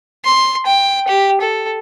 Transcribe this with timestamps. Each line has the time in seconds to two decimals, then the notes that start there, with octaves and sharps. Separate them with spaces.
0.25 C6
0.66 G5
1.08 G4
1.41 A4